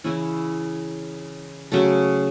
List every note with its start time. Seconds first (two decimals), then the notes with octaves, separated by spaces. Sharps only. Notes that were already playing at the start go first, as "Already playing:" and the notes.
0.04 C#3 E3 C#4 E4
1.72 C#3 F#3 A3